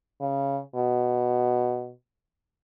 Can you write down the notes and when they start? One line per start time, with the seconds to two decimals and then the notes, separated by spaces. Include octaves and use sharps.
0.21 C#3
0.76 B2